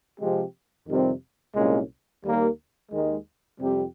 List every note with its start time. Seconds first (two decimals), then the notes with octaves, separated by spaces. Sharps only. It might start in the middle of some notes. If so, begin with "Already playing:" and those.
0.20 C3 F3 G#3 C4 G4
0.88 F2 C3 D#3 G3 C4
1.55 C2 A#2 G#3 C#4
2.24 D#2 D#3 G3 A#3
2.92 D#2 D#3 G#3
3.60 F2 C3 G3 C4 G4